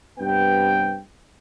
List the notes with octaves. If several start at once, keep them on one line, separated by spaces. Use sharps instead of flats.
G2 C3 B3 G5